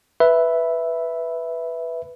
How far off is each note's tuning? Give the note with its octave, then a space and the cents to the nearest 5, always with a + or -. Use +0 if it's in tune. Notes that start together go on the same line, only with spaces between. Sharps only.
B4 +0 E5 +0 B5 +0